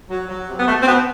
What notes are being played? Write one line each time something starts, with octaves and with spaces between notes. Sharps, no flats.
F#3
F#3
C3
B3
B2 A3
C4
B2 B3